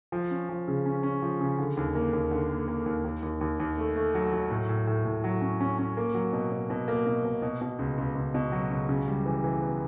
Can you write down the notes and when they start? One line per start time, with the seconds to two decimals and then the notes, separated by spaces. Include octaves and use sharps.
0.12 F3
0.31 C#4
0.49 F3
0.68 C#3
0.86 C#4
1.03 C#4
1.22 F3
1.41 C#3
1.58 D3
1.77 D#2
1.95 A#3
2.13 D#2
2.31 D3
2.50 A#3
2.68 A#3
2.86 D#2
3.05 D#2
3.22 D#2
3.41 D#2
3.60 D#2
3.78 A3
3.96 A3
4.15 F#3
4.33 F#3
4.51 A2
4.69 A2
4.87 A2
5.05 A2
5.24 F#3
5.41 C#4
5.60 C#4
5.78 C#4
5.97 A#3
6.14 F#3
6.33 B2
6.52 B2
6.70 B2
6.88 A#3
7.07 B2
7.25 B2
7.42 B2
7.61 B2
7.79 C#2
7.98 C#2
8.15 C#2
8.34 B2
8.52 F#3
8.70 C#2
8.89 C#3
9.08 G3
9.26 E3
9.44 E3
9.62 B3